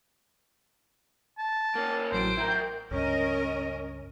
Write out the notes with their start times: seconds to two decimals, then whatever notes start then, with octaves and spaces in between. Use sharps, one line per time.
1.38 A5
1.75 A#3 C#4
2.12 A1 F#3 C5 D7
2.37 E4 A#4 G5 A#5 G6
2.91 C#2 G2 C#4 A#4 D#5